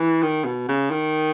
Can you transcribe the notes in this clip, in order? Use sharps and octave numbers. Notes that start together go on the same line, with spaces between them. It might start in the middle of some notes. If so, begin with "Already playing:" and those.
Already playing: E3
D#3
B2
C#3
D#3